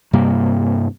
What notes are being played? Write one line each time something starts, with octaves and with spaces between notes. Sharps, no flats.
G2 C3 G3 A#3